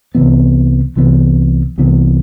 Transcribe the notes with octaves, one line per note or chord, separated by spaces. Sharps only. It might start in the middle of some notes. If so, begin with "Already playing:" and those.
C2 C3 E3 B3
C2 C3 E3 B3
C2 C3 E3 B3